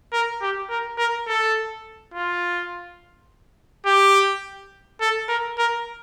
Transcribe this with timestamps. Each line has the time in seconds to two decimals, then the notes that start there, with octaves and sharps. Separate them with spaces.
0.13 A#4
0.42 G4
0.70 A#4
0.98 A#4
1.28 A4
2.14 F4
3.86 G4
5.01 A4
5.29 A#4
5.58 A#4